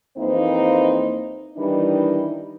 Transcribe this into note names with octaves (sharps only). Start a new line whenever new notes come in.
F2 E3 A#3 C4 D#4 C5
D#3 E3 G3 D4 D#4